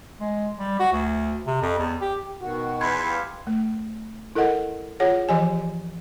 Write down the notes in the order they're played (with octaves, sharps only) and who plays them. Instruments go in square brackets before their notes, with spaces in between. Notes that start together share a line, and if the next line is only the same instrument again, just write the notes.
[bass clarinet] G#3
G3
F#4
D2
C3
F2
E2
G4
[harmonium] B2 D#3 F#4
[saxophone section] E2 [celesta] B5 C6 G#6
[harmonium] G4 F5
[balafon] A3
E4 A4 A#4 D#5 F#5
F4 G#4 C#5 F#5
E3 F3 G4 D#5 G#5